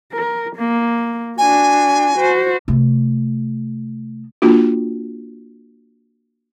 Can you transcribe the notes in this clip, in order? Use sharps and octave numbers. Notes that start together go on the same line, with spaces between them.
A#4
A#3
D4 F#4 G#5
F#4 C5
C3 A3
A#3 D4 F4 F#4